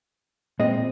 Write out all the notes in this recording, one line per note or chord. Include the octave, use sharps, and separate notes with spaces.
A#2 G#3 C4 D#5